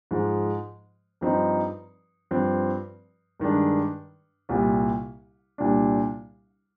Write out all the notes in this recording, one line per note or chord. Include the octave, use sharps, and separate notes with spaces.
G#2 F3 G#3
G2 F3 C4 D#4
G2 F3 C4
G2 D#3 G#3 D4
C2 A#2 G3
C2 A#2 G3 D4